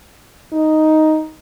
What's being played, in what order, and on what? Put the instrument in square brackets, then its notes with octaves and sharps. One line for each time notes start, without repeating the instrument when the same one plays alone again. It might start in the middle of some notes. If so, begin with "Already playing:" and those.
[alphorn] D#4